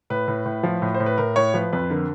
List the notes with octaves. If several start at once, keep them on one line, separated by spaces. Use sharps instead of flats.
A2 B4
A2
A2
F3
A2
C5
A2
B4
A2 A#4
A2 C#5
F3 B4
F2 B4
D3 A#4